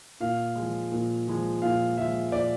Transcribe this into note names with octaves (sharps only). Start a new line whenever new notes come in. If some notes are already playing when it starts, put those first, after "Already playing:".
A#2 F5
F3 G#3
A#2
F3 G#3
A#2 F5
F3 G#3 E5
A#2 D5